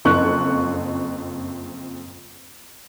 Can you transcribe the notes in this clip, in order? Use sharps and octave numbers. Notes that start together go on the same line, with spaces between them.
F#1 F2 C#6 F#6